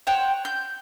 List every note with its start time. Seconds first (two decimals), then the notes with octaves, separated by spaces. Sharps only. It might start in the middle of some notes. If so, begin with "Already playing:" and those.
0.07 C5 C#5 F#5 G5
0.45 G6